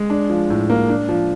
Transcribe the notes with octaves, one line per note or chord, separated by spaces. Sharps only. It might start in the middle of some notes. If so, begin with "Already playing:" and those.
Already playing: G#3
D4
F3
A2
A#3
D4
F3